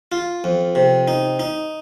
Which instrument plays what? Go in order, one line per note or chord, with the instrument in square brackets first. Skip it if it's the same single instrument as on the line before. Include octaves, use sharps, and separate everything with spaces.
[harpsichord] F4
F2
C3
D#4
D#4